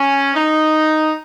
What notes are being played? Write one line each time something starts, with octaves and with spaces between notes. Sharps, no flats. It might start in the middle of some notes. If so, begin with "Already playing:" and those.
Already playing: C#4
D#4